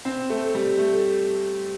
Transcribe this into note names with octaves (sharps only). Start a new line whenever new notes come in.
C4
A3
G3
A3